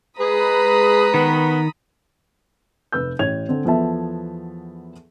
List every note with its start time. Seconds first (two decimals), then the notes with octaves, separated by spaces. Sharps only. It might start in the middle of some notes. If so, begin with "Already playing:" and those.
0.20 G#3 G#4 B4 A#5 B5 D#6
1.14 D#3 B3
2.92 F1 B4 E6 G6
3.19 A1 C#5 G#6 F7
3.49 D3 C4
3.65 E2 F3 B3 A4 E5 A5